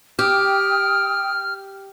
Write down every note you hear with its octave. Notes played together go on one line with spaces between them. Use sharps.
G4 G5 D#6 F6